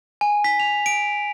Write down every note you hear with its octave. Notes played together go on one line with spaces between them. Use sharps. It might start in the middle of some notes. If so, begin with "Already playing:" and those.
G#5
B6
F7
D7